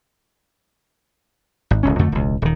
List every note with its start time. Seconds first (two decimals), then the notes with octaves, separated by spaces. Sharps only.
1.71 G#1
1.83 D1 C#2 C#4
1.99 F2 D3 A3
2.12 E1 C#2
2.42 D#1 D#3